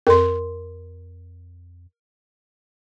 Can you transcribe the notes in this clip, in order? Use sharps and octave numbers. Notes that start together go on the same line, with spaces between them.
F2 A#4 C6